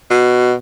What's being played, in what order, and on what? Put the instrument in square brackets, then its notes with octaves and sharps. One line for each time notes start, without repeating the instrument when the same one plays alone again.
[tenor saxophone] B2